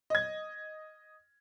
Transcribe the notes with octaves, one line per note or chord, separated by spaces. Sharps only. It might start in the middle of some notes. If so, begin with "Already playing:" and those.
D#5 G#6